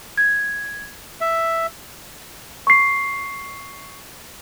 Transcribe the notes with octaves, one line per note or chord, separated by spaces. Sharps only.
G#6
E5
C#6 C7